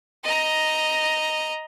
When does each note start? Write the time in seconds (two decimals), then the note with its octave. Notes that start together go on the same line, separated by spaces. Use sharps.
0.24 D#5 A#5